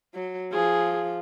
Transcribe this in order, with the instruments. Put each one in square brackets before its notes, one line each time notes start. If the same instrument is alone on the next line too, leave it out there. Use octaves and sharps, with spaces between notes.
[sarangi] F#3
[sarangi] F3 [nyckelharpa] G#4